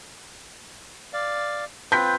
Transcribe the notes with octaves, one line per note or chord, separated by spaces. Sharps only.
D5 F5
C4 F4 B4 G6 B6